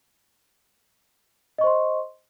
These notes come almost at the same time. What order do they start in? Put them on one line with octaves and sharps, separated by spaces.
D#5 C#6 C5 C6